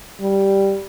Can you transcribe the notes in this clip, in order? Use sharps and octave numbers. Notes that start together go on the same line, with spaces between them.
G3